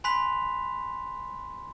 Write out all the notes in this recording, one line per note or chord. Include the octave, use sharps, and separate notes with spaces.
G#5 B5 C6 F#6 B6 F7